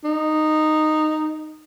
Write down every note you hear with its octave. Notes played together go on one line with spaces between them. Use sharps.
D#4